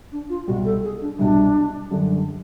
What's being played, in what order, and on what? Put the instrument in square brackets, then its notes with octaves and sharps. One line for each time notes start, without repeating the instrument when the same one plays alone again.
[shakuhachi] D4
F4
[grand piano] C2 B2 G3 [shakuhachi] F#4
[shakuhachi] A4
G#4
D4
[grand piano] C2 B2 G3 [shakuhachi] D4
[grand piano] F#2 D3 G3